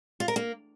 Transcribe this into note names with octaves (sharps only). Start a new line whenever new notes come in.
F4
A#4
A#3